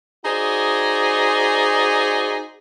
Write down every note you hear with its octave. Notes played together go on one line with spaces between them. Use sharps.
D#4 F#4 G#4 C5 D5